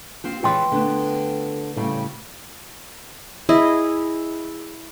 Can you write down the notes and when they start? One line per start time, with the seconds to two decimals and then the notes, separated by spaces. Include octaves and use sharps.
0.24 C4 F4 G4
0.43 E3 G#3 F4 C#5 G5 C6
0.72 D3 A3 B3
1.77 A2 C#3 G3 A3
3.49 E4 G#4 D#5